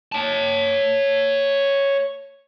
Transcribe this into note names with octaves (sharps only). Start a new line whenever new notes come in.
C#5 A5